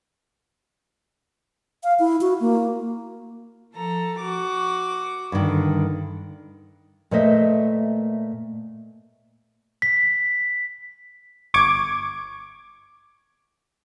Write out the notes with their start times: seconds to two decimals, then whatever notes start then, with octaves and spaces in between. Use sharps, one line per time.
1.84 F5
1.99 E4
2.21 F#4
2.40 A#3
3.72 F3 A4 A#5
4.20 F#4 D6
5.32 G2 D3 D#3
7.11 A#2 A3 B4 C5 D#5 E5
9.82 B6
11.54 G1 C#6 D6 G#6 D7